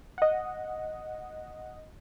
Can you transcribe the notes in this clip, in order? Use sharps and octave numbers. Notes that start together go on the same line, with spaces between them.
D#5 F#5